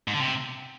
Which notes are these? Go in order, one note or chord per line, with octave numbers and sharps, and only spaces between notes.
G#2
D3
C3